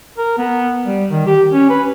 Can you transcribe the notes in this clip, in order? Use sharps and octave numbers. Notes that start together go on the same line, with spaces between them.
A#4
B3
G3
D#3
G4
C#4
B4